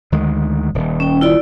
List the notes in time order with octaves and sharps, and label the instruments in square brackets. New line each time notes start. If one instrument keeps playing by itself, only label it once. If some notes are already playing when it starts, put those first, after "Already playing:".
[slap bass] D2 D#3 G#3
D#1
[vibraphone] C#4 G5
E4 F4 D5